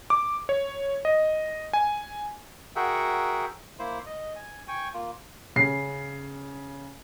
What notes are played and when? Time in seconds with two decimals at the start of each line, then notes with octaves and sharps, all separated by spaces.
0.10 D6
0.49 C#5
1.05 D#5
1.73 G#5
2.76 F#4 G#4 A#4 E5 F#5 G5
3.79 A#3 E4 C5
4.06 D#5
4.36 G#5
4.68 G5 G#5 C#6
4.94 A#3 F4
5.56 C#3 C7